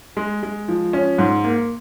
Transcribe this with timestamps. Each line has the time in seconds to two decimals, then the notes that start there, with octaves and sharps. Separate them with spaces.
0.17 G#3
0.43 G#3
0.68 F3
0.93 C#4
1.18 G#2
1.44 A#3